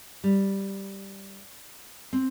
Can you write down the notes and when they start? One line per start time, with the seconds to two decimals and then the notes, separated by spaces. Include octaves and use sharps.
0.24 G3
2.13 C4